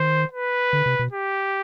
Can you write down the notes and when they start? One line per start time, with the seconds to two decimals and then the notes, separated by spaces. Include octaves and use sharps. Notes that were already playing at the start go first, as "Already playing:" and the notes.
Already playing: D#3 C5
0.33 B4
0.73 D3
0.86 C3
0.99 B2
1.12 G4